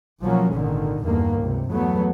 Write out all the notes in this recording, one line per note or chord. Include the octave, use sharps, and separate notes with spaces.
B1 F3 F#3 A#3 C#4
G#1 A#2 D3 D#3
E2 G2 D3 D#3 A#3
C#2 C3
E2 F#3 A3 B3